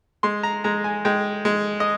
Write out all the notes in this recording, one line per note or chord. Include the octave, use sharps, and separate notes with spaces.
G#3 C6
A#5
G#3 A#5
G#5
G#3 G5
G#3
D#5